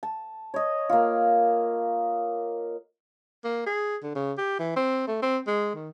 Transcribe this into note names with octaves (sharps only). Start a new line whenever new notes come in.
A5
C#5 D#5
A#3 F4
A#3
G#4
D3
C#3
G4
E3
C4
A3
C4
G#3
D#3